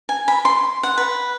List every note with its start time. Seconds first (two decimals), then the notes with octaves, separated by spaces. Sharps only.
0.09 G#5
0.28 B5
0.45 C6
0.83 F#5
0.98 B4